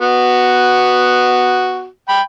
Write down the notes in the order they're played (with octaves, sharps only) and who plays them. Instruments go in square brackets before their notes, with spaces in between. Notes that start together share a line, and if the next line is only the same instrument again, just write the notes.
[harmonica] B3 F#4
G5 B5